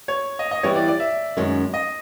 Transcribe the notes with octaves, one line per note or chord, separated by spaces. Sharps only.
C#5
D#5
D#5
E3 G3 B3 C#5
D5
D5
E5
F#2 D#3 G#3 C#4
D#5